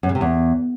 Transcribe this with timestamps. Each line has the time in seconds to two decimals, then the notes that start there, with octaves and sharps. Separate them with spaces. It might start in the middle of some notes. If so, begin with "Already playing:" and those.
0.03 F#2
0.09 C#3
0.15 C3
0.21 E2